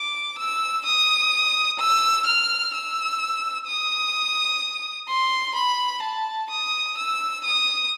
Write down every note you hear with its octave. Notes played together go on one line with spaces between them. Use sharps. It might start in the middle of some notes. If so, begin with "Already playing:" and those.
Already playing: D6
E6
D#6
E6
F6
E6
D#6
C6
B5
A5
D#6
E6
D#6